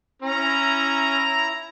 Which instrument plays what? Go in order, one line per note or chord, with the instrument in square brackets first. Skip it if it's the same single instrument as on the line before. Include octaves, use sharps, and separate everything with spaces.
[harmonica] C#4 [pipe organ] E4 A#5